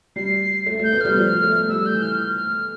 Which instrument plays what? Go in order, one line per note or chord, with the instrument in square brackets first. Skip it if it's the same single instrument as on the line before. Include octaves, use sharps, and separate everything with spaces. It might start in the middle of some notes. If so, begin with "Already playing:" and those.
[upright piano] G3 [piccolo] C7
[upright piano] A3
A3
[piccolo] G6
[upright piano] B3
[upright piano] G3 [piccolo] F6
[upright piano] F3
A3
[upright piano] G3 [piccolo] E6
[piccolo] G6
[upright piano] E3
[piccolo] F6
F6